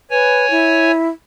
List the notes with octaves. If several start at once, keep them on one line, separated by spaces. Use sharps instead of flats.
B4 C#5 G#5
E4